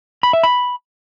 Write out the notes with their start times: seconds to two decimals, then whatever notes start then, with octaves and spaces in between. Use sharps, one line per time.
0.23 B5
0.33 E5
0.43 B5